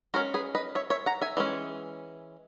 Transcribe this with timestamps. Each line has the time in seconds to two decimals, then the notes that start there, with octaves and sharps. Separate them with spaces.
0.14 G#3 C#4 F#4 A#4
0.34 G#4 B4
0.55 B4 D#5
0.75 C#5 E5
0.90 C#5 E5
1.06 F#5 A#5
1.21 E5 G#5
1.37 E3 G#3 C#4